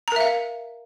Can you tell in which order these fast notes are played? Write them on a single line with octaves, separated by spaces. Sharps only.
A#5 A#4 E5 F5